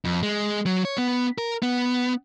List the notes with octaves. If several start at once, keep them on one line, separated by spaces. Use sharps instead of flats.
F2
G#3
F#3
C#5
B3
A#4
B3